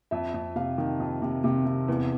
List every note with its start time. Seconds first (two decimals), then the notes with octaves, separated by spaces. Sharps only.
0.11 F2 E5
0.34 F2
0.56 C3 F5
0.78 D#3
1.00 F2
1.22 C3
1.44 C3
1.65 C3
1.88 E2